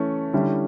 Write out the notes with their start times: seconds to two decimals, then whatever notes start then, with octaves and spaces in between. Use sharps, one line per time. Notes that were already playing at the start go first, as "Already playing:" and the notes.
Already playing: E3 A3 C#4
0.33 D3 G3 C#4 E4